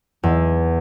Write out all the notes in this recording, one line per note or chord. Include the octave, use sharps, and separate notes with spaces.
E2